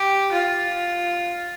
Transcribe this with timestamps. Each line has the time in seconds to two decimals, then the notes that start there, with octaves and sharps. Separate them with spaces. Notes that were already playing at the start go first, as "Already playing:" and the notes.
Already playing: G4
0.32 F4